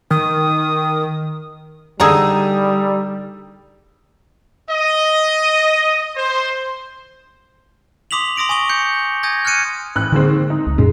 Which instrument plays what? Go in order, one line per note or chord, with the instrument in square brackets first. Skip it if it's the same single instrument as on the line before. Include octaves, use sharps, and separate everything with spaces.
[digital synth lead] D#3 [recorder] D#6
[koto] D3 D#4 G#4 [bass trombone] G3 [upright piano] A#5 D#6 E6
[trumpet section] D#5
C5
[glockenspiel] C6 D6 D#6 B6 F7 F#7
C6 D#6 A#6 D7 F#7
G#5 C#6 D#6 G7
G6 C#7
G#5 D#6 G6 G#6 A#6
F6 F#6 G#6 C#7 D#7
[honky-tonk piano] A1 F#6
[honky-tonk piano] D#2 G#3 C4 [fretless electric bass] D3
[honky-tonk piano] D#4
[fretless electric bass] C#2
[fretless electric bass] F#2 A#2 C#4 [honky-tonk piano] G#3